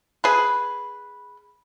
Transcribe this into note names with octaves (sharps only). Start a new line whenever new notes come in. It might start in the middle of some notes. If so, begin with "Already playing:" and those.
G#4 B4